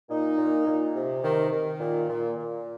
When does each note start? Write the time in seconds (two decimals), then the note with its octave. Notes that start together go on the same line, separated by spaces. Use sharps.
0.10 A#2 D#4
0.38 A#2
0.67 A#2
0.95 C3
1.24 D#3
1.52 D#3
1.80 A#2
2.09 A#2
2.37 A#2